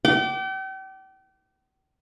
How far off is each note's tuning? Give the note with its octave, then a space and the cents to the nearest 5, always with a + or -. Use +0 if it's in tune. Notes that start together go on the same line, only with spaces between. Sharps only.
G5 -40 D6 +0